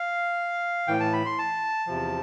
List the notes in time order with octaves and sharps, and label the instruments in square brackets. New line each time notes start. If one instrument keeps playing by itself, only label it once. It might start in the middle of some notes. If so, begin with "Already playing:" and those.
Already playing: [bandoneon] F5
A2 E3 G5
A5
B5
C6
A5
E2 C3 F3